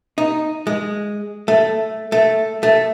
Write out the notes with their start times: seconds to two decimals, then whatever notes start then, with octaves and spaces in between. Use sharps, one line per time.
0.18 D#4
0.67 G#3
1.48 A3
2.12 A3
2.63 A3